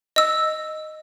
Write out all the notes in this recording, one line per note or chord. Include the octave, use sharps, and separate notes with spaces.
D#5 E6